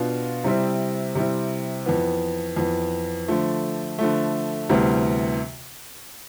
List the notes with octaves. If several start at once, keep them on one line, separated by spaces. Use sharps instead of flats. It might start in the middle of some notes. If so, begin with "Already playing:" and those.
Already playing: B2 B3 D4 F4
C3 G3 C4 E4
C3 G3 C4 E4
F2 E3 B3
F2 E3 B3
D3 F3 A3
D3 F3 A3
D2 C3 E3 G3 B3